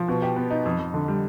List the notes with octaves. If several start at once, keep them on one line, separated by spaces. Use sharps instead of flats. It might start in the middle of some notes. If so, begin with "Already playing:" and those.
Already playing: F3
B2
G4
B3
D#4
F2
F2
D3
G3